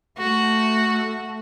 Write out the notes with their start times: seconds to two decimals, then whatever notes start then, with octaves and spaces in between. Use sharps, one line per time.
0.18 A3 F#4